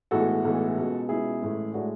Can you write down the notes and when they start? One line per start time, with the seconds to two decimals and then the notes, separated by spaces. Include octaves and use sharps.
0.11 B1 A2 E3 G#3 F#4 A4
0.44 B1 A2 E3 G#3
0.76 C#2 B2 G#3
1.08 C#2 B2 G#3 E4 G#4
1.42 A1 A2 G#3
1.74 A2 G#3 D4 F#4